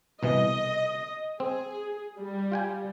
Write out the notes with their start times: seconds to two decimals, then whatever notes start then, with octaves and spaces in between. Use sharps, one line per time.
0.23 C2 B2 E3 D#5
1.40 C4 G#4
2.18 G3
2.52 F4 G5 G#5